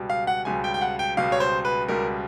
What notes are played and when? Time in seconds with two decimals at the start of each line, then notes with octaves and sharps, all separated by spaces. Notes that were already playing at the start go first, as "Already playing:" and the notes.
Already playing: C#2 B2 G3
0.10 F5
0.27 F#5
0.45 C#2 B2 G3 G#5
0.64 G5
0.74 G5
0.81 F#5
0.99 G5
1.17 C#2 B2 G3 F5
1.32 C#5
1.40 C5
1.65 B4
1.88 C#2 B2 G3 A#4